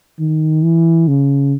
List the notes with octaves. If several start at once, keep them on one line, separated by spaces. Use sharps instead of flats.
D#3
E3
C#3